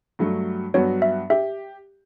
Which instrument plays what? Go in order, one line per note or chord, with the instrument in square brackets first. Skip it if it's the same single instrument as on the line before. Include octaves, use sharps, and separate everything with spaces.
[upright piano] G2 F#3 A3
[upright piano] G2 F#3 B3 F#4 [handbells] C#5
[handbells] E5
[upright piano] G4 [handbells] E5